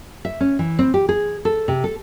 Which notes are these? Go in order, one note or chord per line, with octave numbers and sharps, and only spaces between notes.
E5
C#4
E3
C4
G4
G#4
A4
C3
A4